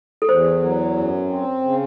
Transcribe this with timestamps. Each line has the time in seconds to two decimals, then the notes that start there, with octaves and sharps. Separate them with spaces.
0.22 A4
0.28 E2 C5
0.63 F#3
0.96 F#2
1.30 C4
1.62 C#3